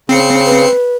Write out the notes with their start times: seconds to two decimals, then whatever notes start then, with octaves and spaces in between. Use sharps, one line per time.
0.09 C#3 C4 C7 C#7
0.46 B4